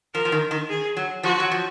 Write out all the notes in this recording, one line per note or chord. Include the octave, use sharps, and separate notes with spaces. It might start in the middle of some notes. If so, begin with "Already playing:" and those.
F3 A#4
F3
D#3
D#3
G#4
F#3
F3 F#4
F#3
F3